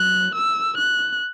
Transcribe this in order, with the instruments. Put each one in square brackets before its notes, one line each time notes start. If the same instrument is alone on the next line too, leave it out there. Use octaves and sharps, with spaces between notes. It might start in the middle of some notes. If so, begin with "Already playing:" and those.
Already playing: [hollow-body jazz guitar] F#3 [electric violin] F#6
[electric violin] E6
F#6